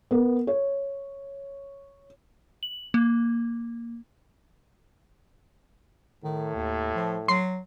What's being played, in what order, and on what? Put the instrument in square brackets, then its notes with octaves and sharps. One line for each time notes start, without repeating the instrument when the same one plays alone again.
[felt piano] B3 A#4
C#5
[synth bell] F#7
A#3
[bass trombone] A2 [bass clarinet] D#3
[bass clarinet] D#2
F3
[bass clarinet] F#3 [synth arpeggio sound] C6 C7